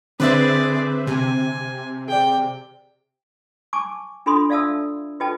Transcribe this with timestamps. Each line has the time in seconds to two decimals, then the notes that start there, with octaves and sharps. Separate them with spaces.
0.20 D3 C4 G#4 B4 C5 D5 E5
1.07 C3 G#5
2.08 G#4 D5 G5
3.73 G#5 A5 C#6 D6
4.26 D4 F4 A4 B5 C6 D#6
4.50 D5 E5 F5 A5 D#6 E6
5.20 F4 A4 B4 D#5 G5 A5